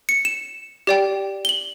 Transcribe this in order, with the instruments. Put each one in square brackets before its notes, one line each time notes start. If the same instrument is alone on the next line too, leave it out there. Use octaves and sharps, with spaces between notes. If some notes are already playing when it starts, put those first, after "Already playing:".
[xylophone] C#7
E7
G4 D5 G5
G7
F#7